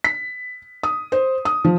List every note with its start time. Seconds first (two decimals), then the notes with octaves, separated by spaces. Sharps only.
0.04 B6
0.83 D#6
1.12 C5
1.45 D#6
1.65 F3